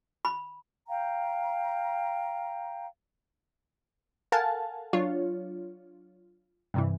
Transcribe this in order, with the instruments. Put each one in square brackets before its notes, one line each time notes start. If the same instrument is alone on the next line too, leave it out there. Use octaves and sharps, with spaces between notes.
[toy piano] B5
[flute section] F5 G5 A#5
[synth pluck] A4 A#4 F5 F#5 G#5 A5
F#3 D4 F4 C#5
G2 C3 E3